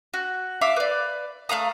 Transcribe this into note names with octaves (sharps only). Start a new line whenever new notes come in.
F#4
E5 F5 D6
B4 D5
A3 F5 A#5 D#6